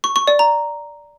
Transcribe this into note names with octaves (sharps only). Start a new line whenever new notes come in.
C#6
C#6
D5
A#5